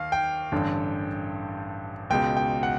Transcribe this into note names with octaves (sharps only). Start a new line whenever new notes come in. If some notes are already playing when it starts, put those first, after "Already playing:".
Already playing: D#2 F5
G5
A1 G2 D3
C#2 B2 G#3 G5
G5
F#5